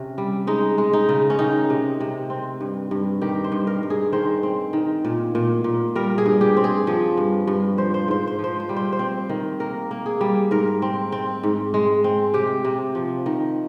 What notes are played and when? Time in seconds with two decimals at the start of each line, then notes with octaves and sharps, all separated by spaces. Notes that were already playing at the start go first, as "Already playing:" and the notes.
Already playing: C3 C#4
0.18 G3
0.47 G#3 D#4
0.78 G#3
0.93 D#4
1.09 C#3
1.30 C#4
1.39 D#3 D#4
1.70 C3
2.00 C3
2.30 C4
2.61 G2
2.91 G2
3.21 D#3 G4
3.44 C5
3.52 G2
3.67 A#4
3.83 G2
3.90 G#4
4.13 D#3 C5
4.43 C4
4.73 D#3
5.05 A#2
5.35 A#2
5.64 A#2
5.95 G3 A#4
6.18 G#4
6.26 G2
6.41 G4
6.57 C4
6.64 G#4
6.87 F3
7.17 G2
7.47 G2
7.78 F3 C5
7.94 C5
8.08 G#2 C5
8.27 C5
8.39 F3
8.44 C5
8.60 C5
8.69 G3
8.76 C5
8.92 C5
8.99 C4
9.29 D#3
9.60 A#3 A#4
9.91 A#3
10.06 G#4
10.21 G3
10.51 G#2 A#4
10.82 C4
11.12 C4
11.43 G#2
11.74 G#3
12.04 C4
12.34 C3 G4
12.65 C3
12.95 F3
13.26 D#3